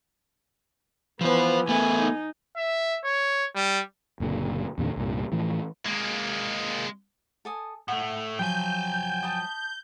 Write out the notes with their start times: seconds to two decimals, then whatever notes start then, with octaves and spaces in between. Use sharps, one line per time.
1.21 E3 F3 B3 C5
1.69 A3 B3 G#5
1.98 D#4
2.57 E5
3.04 C#5
3.55 G3
4.20 F#1 A#2 D3
4.78 E2 A#2 D3 D#3
4.96 C2 G2 A#2
5.32 A2 E3 F3
5.86 G#3 A#3
7.45 A4 G#5 D#6
7.88 A2 A3 F#5
8.39 F3 F#3 G5 G#5 B5 G6
9.23 A5 B5 D#6